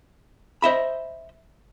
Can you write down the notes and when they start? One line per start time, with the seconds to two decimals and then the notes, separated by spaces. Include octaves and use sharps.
0.62 C5 D#5 E5 B5